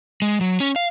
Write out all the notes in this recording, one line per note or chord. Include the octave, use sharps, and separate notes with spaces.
G#3
F#3
C#4
F5